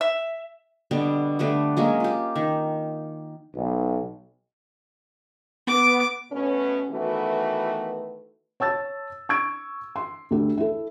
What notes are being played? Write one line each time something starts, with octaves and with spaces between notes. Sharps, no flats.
E5
B2 D3 G3 B3
D3 G3 A3 B4
F#3 G#3 A#3 C#4
F4 G4
D#3
B1
B3 D6
B2 A3 B3 C#4
D#3 E3 A3 B3 F#4 B4
C#5 A5 E6 A6
C#6 E6 G#6 D7
C6
D2 G4
E4 A4